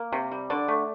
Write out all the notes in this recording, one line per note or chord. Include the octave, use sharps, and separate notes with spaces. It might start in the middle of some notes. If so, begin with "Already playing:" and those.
Already playing: A#3
C3
G3
D3 D5
A3